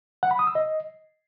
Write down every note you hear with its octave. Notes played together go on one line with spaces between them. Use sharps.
F#5
B5
D#6
E6
D#5